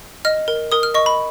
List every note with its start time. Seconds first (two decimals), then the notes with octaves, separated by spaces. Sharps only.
0.25 D#5 F6
0.48 A#4
0.72 A#4 D#6
0.83 F6
0.94 D#5 C#6
1.06 B5